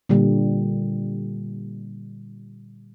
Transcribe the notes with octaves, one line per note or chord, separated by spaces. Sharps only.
A#2 D3 G3